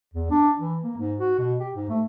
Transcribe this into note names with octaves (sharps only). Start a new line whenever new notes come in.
E2
D4
E3
A#3
G#2
F#4
B2
G4
G#2
A3